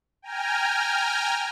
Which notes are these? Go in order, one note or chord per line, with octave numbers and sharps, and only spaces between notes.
G5 G#5 A#5 F6